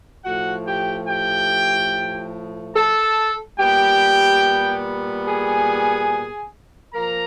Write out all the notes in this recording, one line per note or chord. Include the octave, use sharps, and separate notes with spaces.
A2 F3 A3 F#4 F#5
G4 G5
G4 G5
A4 A5
A#2 G3 B3 G4 G5
G#4 G#5
F3 A#3 A#4 A#5